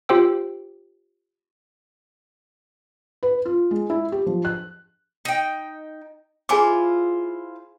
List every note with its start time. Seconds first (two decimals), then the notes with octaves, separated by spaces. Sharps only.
0.09 F4 G4 C5 G5 E6
3.23 B4
3.45 F4
3.71 G#3
3.90 E4
4.12 G4
4.26 F3
4.45 F#6
5.25 D#4 G5
6.49 E4 F4 G#4 C5 G#5 D6